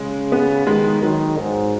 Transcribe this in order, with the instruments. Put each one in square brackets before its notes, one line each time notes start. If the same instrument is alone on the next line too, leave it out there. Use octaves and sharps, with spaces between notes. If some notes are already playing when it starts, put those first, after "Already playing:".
Already playing: [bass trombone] C#3 [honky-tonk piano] G#3
[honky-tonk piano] B3
[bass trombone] D#3 [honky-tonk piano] G#3
[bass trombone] D#3 [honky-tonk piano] F#3
[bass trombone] G#2